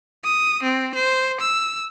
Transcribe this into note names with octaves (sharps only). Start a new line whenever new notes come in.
D#6
C4
C5
E6